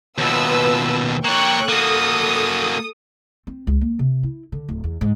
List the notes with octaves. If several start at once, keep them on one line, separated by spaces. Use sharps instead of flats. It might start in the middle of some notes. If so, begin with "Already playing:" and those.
D#2 B2 F4 B4 E6
A#3 C#5 G5 C#6 F#6
A#3 F#4 A4 D#6
C4
C#2
A#3
C3
E4
D3
D1
E2
G#2